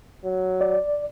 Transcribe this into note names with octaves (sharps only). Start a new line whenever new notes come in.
F#3
D5